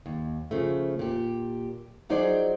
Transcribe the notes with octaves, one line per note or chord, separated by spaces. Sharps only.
D#2
C#3 F3 A3
A#2 G4
F3 F#3 D#4 G#4 C5 D5